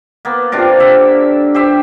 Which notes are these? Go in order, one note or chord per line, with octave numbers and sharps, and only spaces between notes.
A#3 B3
C3 D4 F4 A#4
D3 E5
G4 C5 E5